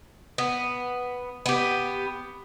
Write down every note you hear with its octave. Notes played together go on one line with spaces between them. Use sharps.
B3
B3 G4